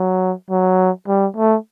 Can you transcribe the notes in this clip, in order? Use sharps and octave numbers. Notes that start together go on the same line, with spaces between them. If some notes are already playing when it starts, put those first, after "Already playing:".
Already playing: F#3
F#3
G3
A3